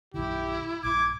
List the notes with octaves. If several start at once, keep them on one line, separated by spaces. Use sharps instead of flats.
A#1 F#2 D#3 E4 G4
A#1 G2 D6 G#6